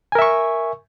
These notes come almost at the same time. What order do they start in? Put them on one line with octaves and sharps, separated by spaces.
G#5 A#4 E5 C#6